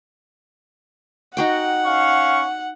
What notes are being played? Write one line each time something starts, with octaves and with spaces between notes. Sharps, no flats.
D#4 F#4 F#5 G5
C#4 F5 C#6